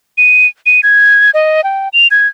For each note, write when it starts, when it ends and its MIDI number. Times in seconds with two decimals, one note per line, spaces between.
0.18 0.47 99
0.66 0.81 99
0.83 1.31 92
1.34 1.64 75
1.64 1.89 79
1.93 2.08 101
2.11 2.27 92